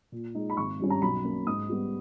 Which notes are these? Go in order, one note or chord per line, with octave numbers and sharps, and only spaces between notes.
A#2
G#3 D#4
B5
G#1 C#6
G2 G3 C#4
A#5
B1 B5
B2 A#3 C#4
G#2 D#6
G3 B3